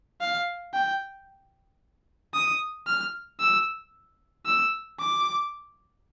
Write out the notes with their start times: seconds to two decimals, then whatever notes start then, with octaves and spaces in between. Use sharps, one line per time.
0.21 F5
0.74 G5
2.34 D#6
2.87 F6
3.40 E6
4.46 E6
5.00 D6